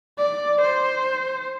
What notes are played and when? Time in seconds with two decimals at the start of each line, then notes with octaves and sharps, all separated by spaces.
0.18 D5
0.61 C5